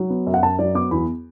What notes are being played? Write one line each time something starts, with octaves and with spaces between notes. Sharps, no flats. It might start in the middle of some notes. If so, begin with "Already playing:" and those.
Already playing: F#3
B3
F#2
F#5
F#2 A5
F#3 D5
B3 D6
E2 B5